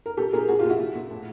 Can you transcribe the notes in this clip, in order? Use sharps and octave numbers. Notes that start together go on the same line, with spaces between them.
A#4
A#2 G4 A4
A#2 G#4 A#4
A#2 F#4 G#4
F4 G4
A#2
E4 F#4
A#2
A#2
A2